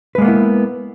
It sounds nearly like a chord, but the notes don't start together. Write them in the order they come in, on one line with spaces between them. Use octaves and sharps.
B4 G#3 A#3 B3 E4